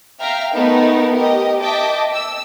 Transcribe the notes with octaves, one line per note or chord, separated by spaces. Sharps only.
E5 F5 G5 A#5 F6
A3 B3 D#4 A#4 B4
G4 A#4 D#5
D#5 E5 G5 A5 D6
E6